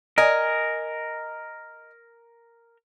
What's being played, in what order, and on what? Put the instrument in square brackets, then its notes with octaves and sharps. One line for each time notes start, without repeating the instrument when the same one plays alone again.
[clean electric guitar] A#4 [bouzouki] D#5 G#5